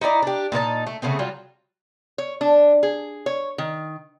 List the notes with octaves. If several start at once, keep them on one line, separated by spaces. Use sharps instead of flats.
D#4 E4 D5 A#5
D4 G4
A#2 D#4 E4 A5
A3
C#3 A3 B3 C4
F#3 G3 F4
C#5
D4
G#4
C#5
D#3